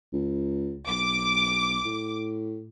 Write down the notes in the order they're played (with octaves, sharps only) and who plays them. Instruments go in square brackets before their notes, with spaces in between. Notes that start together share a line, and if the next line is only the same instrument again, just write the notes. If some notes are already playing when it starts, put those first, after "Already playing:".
[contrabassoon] C#2
[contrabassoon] B1 [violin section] D6
[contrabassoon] A2